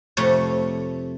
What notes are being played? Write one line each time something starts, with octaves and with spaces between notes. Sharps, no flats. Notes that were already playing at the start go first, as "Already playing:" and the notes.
F2 C3 A3 C#5